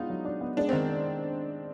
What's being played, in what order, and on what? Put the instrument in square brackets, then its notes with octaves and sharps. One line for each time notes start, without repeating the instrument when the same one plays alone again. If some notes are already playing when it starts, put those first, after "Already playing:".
Already playing: [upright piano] G#3 B3 D4 F4 [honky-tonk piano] D#4
[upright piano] F#3
D4
B3
[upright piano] G#3 [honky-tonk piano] D4
[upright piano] D#3 [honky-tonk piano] C4